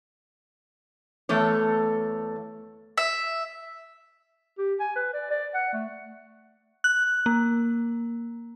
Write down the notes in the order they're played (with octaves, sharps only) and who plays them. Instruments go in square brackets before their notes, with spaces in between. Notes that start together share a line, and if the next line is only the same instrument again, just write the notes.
[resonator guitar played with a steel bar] E2 A3 A4 C#5
[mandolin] E5
[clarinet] G4
G#5
B4
D5
D5
F#5
A3
[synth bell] F#6
A#3